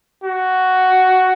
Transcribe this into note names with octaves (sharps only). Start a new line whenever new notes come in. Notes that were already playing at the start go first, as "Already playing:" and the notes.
F#4